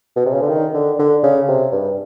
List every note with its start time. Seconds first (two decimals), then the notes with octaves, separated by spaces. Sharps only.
0.16 B2
0.26 C3
0.33 C#3
0.41 D3
0.49 D#3
0.74 D3
0.99 D3
1.23 C#3
1.49 C3
1.72 G2